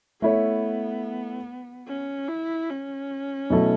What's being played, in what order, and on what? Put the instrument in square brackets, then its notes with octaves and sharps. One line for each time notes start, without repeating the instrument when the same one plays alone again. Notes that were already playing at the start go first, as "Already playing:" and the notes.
[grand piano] A3 E4 C#5 [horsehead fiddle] B3
[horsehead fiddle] C#4
E4
C#4
[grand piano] B2 F#3 A3 E4 A4